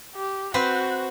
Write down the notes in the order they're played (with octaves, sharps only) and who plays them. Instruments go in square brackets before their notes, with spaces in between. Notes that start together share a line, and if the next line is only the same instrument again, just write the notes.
[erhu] G4
[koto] C4 B4 C5 [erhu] F#4